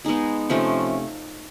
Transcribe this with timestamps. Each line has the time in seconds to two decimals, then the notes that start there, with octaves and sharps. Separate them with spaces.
0.05 G#3 B3 D#4 G#4
0.49 C3 F3 A3 C#4